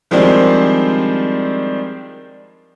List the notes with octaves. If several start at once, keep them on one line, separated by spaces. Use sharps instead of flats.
D#3 F3 G3 G#3 C4 D4